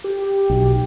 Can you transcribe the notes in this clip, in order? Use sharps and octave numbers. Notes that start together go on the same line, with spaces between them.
G4
B1